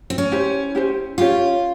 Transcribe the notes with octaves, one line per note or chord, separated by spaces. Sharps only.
C4
C#4
E4 G4 C5
E4 G4 C5
C#4 F4 G4 C#5